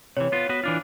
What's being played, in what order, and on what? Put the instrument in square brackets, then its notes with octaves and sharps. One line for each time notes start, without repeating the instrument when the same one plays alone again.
[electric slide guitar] C3 E3 [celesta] C#5
[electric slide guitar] B3 F4
B3 F#4 B4
E3 D4 F4